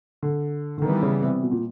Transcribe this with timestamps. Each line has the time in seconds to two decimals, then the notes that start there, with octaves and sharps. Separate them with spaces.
0.23 D3
0.78 D3
0.82 D#3 E3 G3 B3
1.03 C#3
1.22 C3
1.43 B2
1.52 A#2